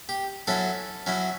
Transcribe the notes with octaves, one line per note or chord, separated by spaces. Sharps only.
G4
F#3 C#4 E4 A4
F#3 C#4 E4